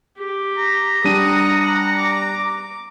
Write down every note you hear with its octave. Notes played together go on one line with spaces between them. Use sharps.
G4
A#5
G3 D4 F#5 D#6 D#7
F#5
D6